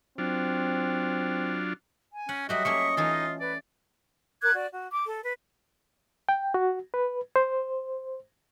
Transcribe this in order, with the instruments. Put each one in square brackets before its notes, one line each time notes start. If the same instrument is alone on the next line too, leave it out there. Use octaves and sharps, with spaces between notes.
[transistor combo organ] F#3 D4 F4 [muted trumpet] C4
[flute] G#5
[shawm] C#4 [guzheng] F#5
[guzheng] F#3 G3 A3 [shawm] F#4 [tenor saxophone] D#5 [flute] E5
[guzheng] A3 A#3 C#4 [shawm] C#6
[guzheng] E3 C#4 A4 [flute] D#4 [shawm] F4
[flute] B4 [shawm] D5
[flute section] A#4 D6 F#6 G#6
F#4 D5
F#4
D6
A4
B4
[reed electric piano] G5
F#4
B4
C5